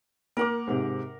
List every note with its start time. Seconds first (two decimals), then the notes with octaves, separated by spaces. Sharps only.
0.37 A#3 A#4 F#5 D6
0.67 G#2 C3